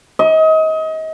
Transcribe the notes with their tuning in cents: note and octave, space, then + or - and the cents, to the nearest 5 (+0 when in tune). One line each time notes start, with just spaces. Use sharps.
D#5 +30